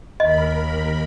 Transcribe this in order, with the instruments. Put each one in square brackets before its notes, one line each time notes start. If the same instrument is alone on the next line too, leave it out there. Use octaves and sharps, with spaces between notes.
[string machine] D#2 A#4 B5 [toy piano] D#5